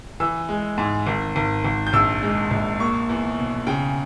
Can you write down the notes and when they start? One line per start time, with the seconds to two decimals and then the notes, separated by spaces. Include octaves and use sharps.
0.20 E3 E6
0.49 G#3
0.78 G#2
1.07 G#1
1.36 G#1
1.65 G#1
1.87 G6
1.93 A#1 E6
2.23 G#3
2.51 A#1
2.80 A#3 C#6
3.09 E2
3.38 B2
3.67 C#3 G5